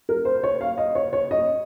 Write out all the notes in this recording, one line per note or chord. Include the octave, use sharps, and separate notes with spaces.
A#4
C5
C#5
F5
D#5
C#5
C#5
D#5